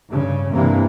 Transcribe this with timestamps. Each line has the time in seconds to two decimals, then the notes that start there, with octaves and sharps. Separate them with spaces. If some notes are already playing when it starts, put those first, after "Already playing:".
0.10 G2 C#3
0.52 G2 C3 E3 A#3